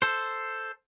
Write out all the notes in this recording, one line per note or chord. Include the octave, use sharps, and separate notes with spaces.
A4 C5